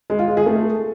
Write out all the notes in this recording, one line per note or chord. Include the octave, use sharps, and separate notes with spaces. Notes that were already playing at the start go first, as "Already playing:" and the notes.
G#3
F4
G#3
G#4
A3